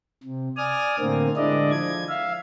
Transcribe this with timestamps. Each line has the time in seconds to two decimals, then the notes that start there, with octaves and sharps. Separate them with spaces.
0.24 C3
0.57 D5 G#5 D#6 F6
0.99 A2 D3 A#3 C4
1.37 D3 G#3 D4 E4 D5 D#5
1.71 F3 G#6
2.09 E5 F5